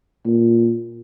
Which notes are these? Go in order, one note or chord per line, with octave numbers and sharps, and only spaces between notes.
A#2